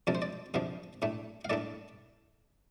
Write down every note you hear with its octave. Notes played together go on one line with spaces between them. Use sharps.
F2 C3 F3 D4 D5
C5
D5
F2 C3 F3 D4 F5
A2 A3 D4
F5
A2 A3 D4 D5